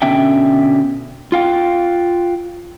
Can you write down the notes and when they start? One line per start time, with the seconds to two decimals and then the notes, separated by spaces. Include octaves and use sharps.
0.02 B2 D3 C#4 E5 G5
1.32 F4 F5 G5